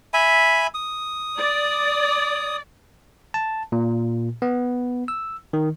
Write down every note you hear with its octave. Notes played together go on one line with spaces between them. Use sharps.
E5 G#5 B5
D#6
D5
A5
A#2
B3
E6
D#3